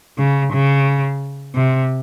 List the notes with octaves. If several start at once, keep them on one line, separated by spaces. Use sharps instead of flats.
C#3
C#3
C3